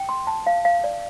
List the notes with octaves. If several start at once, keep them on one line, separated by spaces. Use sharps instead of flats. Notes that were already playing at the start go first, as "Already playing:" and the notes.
Already playing: G5
C6
A5
F5
F5
D5